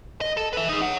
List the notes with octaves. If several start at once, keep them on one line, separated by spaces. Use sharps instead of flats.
D#5
A4
B4 E5
D#4 G#4
C#5 F#5